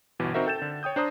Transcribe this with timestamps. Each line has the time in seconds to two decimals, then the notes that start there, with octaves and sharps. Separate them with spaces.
0.19 G1 B2 E3
0.34 C4 D#4 F#4 A#4 C5 E5
0.46 A4 G5 G6 A6 E7
0.62 D3
0.83 C#5 G5 D#6 G6
0.96 D4 C5 A#5 D#6